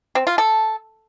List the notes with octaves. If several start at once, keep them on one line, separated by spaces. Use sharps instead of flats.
C4
F4
A4